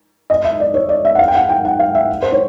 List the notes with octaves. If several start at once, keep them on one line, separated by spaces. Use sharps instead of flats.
D#5
E5
D5
C#5
D5
E5
F#5
F5
G5
F#5
G5
F#5
F5
E5
C5
C#5